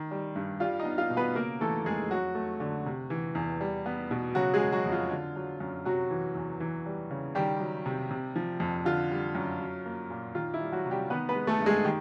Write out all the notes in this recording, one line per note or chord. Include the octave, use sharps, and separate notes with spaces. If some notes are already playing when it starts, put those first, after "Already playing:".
Already playing: D#3
G3
G2
G3 F4 F5
D#4 D#5
B3
F4 F5
B2
B3 B4
C#3 A#3 A#4
E3 A3 A4
F2 G#3 G#4
F#3 F#4
A3
D3
C3
E3
E2
G3
B3
B2
C#3 F#3 F#4
G#3 G#4
F#3
F#3 F#4
F2
F4
D3
F#3
F#2
C3 F#3 F#4
E3
E2
E3
G3
C#3
D#3 G3 G4
F#3
C3
C3
F3
F2
D3 F4
G3
F#2
F#3
A#3
A#2
D#3 F4
E4
G3
F#3 F#4
C3
G3 G4
D#3 B3 B4
B3 B4
G#3
A3 A4
G2
G#3 G#4
D#3 G4